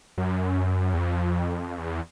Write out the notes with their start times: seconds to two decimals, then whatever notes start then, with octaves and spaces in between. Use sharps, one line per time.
0.18 F#2
0.94 E2
0.98 F2
1.78 E2